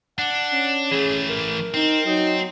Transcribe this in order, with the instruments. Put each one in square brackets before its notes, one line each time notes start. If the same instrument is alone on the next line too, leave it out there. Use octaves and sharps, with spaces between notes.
[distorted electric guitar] D4 [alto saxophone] F#5
[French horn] C#4
[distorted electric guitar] E3 A3 [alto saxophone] G#4
[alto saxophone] A#4
[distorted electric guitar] C4 [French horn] D#4
[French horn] F#3 [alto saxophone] D#4